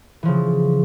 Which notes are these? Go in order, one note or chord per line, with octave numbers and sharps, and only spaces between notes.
C#3 E3 F3